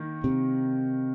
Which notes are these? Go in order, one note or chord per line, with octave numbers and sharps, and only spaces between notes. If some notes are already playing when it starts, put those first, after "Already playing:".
Already playing: D#3 A#3
C3